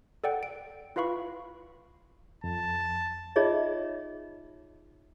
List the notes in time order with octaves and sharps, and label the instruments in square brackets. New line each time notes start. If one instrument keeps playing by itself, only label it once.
[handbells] A4 D5 F#5 G5
D7
E4 F4 B4 F5 B5 C#6
[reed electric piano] F2 [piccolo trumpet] A5
[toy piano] D#4 F4 G#4 C#5 D#5 E5